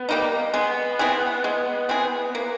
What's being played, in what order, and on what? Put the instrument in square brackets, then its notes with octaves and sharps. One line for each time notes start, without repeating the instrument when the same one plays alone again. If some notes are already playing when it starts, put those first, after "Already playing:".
Already playing: [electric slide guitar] B3
[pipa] G3 A#3 D#4
[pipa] G#3 [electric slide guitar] B3
[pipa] C4 E4 G#4
G#3
C4 E4 G#4
A#3